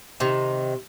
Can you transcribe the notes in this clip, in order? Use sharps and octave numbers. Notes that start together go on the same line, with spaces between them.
C3 D#3